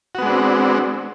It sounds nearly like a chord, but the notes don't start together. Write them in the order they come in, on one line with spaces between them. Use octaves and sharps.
F#4 B3 G#3 D4 C4